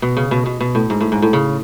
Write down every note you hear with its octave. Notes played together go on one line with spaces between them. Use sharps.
B2
C#3
B2
B2
B2
A2
G#2
A2
G#2
A2
C#3